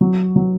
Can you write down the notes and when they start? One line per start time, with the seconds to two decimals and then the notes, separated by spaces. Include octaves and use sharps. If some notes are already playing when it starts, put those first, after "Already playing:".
0.01 F#3
0.36 F#3